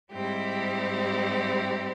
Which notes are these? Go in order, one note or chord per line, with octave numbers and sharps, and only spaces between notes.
G#2 G3 C4 E4 G4